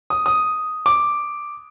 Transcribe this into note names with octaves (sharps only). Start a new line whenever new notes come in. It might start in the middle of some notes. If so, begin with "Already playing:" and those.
D#6
D#6
D6